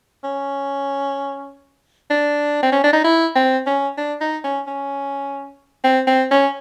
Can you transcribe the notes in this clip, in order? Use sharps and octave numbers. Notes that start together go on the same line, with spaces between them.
C#4
D4
C4
C#4
D4
D#4
E4
C4
C#4
D4
D#4
C#4
C#4
C4
C4
C#4